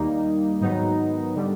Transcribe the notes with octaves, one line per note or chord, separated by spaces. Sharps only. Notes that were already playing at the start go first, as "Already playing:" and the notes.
Already playing: D#2 D#3 G3 A#3 D#4
G#2 D#3 F#3 B3 D#4
D3 G3